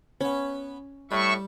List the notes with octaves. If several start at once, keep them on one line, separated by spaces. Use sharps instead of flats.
B3 C#4 B5
A2 G3 E5 C#6